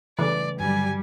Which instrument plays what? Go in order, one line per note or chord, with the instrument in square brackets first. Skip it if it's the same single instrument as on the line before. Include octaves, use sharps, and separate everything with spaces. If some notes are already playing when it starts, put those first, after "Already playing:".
[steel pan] C#3 E3 [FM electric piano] G3 A3 A4 [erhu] D5
[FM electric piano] G2 D3 F#3 [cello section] G3 [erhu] G#5